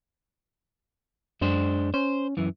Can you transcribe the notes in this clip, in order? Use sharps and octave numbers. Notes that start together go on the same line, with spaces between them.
F#2 G#3 D4 C5
C#4 C5
F#2 E3